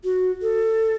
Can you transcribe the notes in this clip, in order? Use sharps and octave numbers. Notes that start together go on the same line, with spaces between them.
F#4
A4